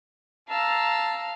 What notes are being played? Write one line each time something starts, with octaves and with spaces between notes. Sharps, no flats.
F5 A5 A#5 E6